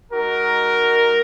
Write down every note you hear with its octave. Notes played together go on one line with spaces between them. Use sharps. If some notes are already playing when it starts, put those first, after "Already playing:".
G#3 D#4 F#4 A#4